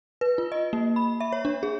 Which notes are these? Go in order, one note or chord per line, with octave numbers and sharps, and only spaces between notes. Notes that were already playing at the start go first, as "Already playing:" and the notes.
B4
F4
D#5
A#3
B5
E5
C#5
D4
G#4